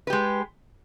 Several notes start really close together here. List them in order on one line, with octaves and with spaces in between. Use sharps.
B4 G4 G#3